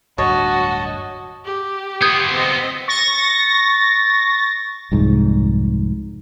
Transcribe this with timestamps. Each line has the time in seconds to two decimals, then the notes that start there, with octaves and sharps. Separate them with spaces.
0.18 D1 G2 D4 F#4 C#5 D#5 A5
1.45 G4
2.02 B3 F4 D#6 G6 G#6
2.32 C4 D#5
2.88 C#6 A6 A#6
4.92 C2 F2 G#2